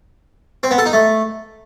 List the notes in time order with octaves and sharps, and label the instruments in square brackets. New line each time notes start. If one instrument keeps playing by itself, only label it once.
[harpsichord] C4
B3
A4
D#4
A3